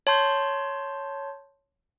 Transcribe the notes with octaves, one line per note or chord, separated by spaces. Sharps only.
C#5 A5 C6 G6